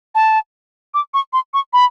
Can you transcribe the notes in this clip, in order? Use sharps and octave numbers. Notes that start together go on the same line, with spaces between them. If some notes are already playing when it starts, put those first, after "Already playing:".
A5
D6
C#6
C6
C#6
B5